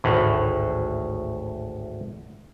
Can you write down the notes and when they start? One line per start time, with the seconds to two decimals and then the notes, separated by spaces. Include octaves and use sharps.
0.04 G#1 D2 A2